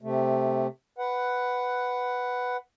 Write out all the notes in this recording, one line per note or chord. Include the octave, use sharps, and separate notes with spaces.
C3 A3
B4 F#5